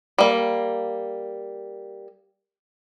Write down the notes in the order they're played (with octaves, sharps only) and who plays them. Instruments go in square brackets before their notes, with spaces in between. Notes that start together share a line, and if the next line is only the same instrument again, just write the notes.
[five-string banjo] G3 A#3